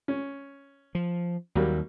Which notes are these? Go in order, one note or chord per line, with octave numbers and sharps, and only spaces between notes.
C#4
F3
D#2 F#3 G3 A#3